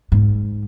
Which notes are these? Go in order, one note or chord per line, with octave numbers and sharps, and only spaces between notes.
G#2